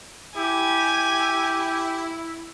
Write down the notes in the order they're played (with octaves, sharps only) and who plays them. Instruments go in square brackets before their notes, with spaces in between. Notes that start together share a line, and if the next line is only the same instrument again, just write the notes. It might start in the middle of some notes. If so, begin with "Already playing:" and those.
[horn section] E4 [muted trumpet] G4 [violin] G#5